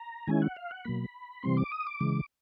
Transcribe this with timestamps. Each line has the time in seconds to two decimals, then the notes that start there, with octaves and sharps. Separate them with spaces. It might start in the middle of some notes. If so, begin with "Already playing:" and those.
Already playing: A#5
0.27 D#3 G#3 C#4 E4 G#5
0.42 F#5
0.56 F5
0.71 F#5
0.85 B2 F#3 A#3 B5
1.43 C3 E3 G3 C4 C6
1.57 D6
1.72 D#6
1.86 D6
2.00 C#3 E3 G#3